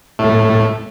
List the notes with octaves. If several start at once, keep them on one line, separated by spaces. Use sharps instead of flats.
A2 A3